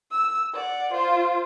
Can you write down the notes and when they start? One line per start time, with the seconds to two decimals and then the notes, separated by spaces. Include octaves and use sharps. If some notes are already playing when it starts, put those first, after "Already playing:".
0.12 E6
0.54 D5 F#5
0.93 F4 C5